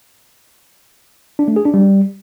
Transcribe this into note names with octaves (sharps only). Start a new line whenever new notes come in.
D4
A3
G#4
D4
G3